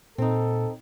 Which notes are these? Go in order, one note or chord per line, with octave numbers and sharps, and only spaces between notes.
A#2 C4 D#4 A4